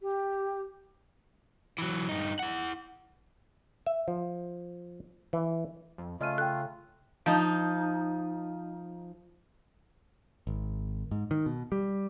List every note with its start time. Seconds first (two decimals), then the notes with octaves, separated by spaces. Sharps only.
0.01 G4
1.78 E3 F#3
2.09 G2 D#4
2.39 E4 F#5
3.86 E5
4.08 F3
5.33 E3
5.98 F2
6.21 C#3 A3 F4 D#5 F6 D#7
6.38 A4 G5 F#6
7.26 F3 D#4
10.47 G#1
11.11 G#2
11.31 D#3
11.46 B2
11.72 G3